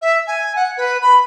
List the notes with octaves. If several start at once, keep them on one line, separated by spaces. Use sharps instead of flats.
E5
G#5
F#5
B4
B5